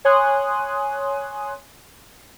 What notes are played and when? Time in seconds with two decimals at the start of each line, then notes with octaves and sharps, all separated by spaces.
0.05 C#5 G#5 C6 D#6 F#6